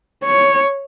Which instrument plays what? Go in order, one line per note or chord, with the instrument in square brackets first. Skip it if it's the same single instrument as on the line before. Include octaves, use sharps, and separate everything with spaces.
[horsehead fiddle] C#5